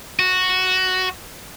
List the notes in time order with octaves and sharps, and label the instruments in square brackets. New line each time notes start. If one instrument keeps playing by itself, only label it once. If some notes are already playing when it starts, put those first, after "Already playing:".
[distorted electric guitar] F#4